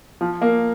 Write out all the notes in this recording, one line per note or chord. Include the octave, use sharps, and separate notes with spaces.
F3
A#3